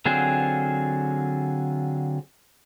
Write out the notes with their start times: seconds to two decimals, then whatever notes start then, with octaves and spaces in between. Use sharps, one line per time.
0.06 D3 F#3 C4 F4 G#4